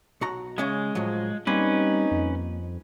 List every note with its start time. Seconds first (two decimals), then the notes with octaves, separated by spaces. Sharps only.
0.21 B1 F#4 A#5
0.58 C#3 G#3 C#4 E5
0.95 A2 F3 F#3
1.47 G3 A#3 C4 C#4 D#4 B4
2.11 F2